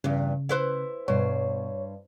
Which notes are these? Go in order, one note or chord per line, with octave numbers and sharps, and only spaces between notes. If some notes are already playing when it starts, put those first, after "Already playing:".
E2 G2 C#3
E4 B4 C5
G2 B2 C5 C#5